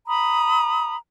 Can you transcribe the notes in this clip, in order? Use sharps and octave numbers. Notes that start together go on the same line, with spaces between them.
A#5 B5 D#6